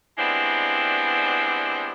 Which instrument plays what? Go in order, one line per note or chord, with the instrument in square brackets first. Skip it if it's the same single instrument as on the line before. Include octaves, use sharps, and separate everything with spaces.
[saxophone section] G3 G#3 B3 C4 D4 E4